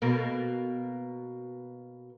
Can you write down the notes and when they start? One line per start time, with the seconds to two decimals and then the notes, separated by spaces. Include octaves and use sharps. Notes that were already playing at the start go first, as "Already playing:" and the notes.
0.02 B2 A#3